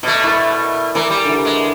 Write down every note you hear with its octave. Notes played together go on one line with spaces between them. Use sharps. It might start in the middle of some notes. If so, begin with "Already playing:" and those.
B2 A3 D5
E4 A#4 B4
E3 A#4 D5 G#5
G3
D3 E3
G#3